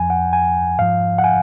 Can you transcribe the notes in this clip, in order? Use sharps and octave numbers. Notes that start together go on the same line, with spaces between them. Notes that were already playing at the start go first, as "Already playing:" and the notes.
Already playing: F2 F3 G#5
F#5
G#5
G#2 F3 F5
F#5
G#5